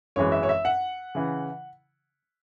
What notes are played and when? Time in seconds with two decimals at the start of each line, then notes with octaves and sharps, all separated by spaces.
0.16 G#1 F#2 E3 G#3 C#5
0.32 E5
0.43 C#5
0.49 E5
0.65 F#5
1.15 C#3 E3